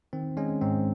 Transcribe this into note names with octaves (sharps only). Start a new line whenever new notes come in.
D#3 C4
G#3 C#4
G#2 C4